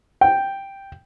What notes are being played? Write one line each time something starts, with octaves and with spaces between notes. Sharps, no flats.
G5